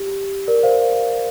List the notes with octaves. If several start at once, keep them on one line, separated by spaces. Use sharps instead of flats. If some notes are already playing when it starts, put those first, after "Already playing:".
Already playing: G4
A#4 D5
C5 F5